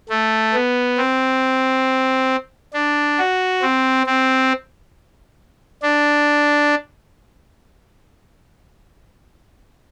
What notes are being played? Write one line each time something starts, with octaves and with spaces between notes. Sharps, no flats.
A3
B3
C4
D4
F#4
C4
C4
D4